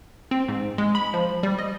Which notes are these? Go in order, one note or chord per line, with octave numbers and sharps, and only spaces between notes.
C4
G#2
G#3
B5
F3
G3
D#5